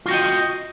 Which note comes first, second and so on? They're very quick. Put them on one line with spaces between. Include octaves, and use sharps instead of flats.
F4 F#4 G5 D#5